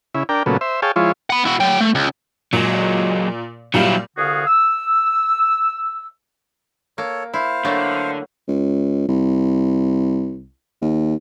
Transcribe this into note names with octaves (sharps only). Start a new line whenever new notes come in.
C#3 E4
D4 A#4 G5
A#2 C#3 F#3 A3 B3
C5 E5
G#4 C#5 F5 G5 A5
F3 G#3 E4 F4 C#5
F#5 B5
E4 F#4
F#3 G5
A3
C#2
A#2 F#3 G#3
A#2 F#3 G3 E4 F5
C2 D3 F#4 G#4 F5 D#6
E6
A#3 A4 C#5
E4 C5 F5
D3 F#3 A3 A#3
C#2
C2
D#2